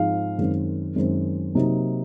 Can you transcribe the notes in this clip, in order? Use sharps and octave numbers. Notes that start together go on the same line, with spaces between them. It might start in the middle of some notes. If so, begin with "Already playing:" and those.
Already playing: G#2 F3 G#3 C4 D#4 F5
F#2 D#3 G#3 C4
F#2 D#3 G#3 C4
C3 F#3 A#3 D#4